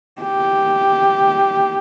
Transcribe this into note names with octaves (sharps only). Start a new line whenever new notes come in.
G4